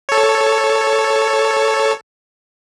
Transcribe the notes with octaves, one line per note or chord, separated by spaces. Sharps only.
A4 C#5